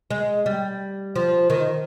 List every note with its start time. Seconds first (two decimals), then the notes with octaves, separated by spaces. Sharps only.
0.11 G#3
0.46 G3
1.16 F3
1.50 D#3